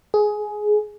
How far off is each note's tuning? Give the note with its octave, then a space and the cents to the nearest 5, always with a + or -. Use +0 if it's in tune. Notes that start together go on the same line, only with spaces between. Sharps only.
G#4 +15